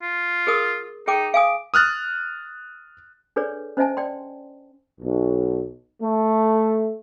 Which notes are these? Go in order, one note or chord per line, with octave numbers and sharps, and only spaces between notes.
F4
G#4 A#4 D#6
D#4 G#4 G5 D6
F5 G#5 D6 D#6
D#6 F6 F#6 A6
D4 G#4 A4 B4 C#5 D5
C#4 C5 D#5 E5 G#5 A5
D5 G5 C6
B1
A3